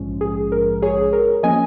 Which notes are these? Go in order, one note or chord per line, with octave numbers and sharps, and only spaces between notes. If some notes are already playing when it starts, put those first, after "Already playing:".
Already playing: A#1 G#2 F3 G#3 C#4
G#4
A#4
G#4 C#5
A#4
F3 A#3 C#4 D#5 G#5